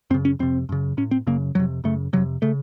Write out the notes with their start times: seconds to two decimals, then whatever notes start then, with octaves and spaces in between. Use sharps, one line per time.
0.10 F#2 C4
0.14 C#3
0.25 C#4
0.39 F2 C3 C4
0.69 F#2 C#3
0.97 A2 C#4
1.11 C4
1.27 F#2 C#3 A#3
1.55 F2 C3 F#3
1.84 F#2 C#3 A3
2.13 F2 C3 F#3
2.42 C#3 A3